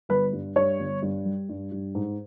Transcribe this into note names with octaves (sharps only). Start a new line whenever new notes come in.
G1 B4
G2
G2 C#5
G1
G2
G3
G2
G2
G#2